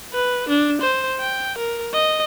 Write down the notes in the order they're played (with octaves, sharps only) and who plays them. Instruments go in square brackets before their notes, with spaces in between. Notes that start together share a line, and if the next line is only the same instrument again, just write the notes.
[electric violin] B4
D4
C5
G5
A#4
D#5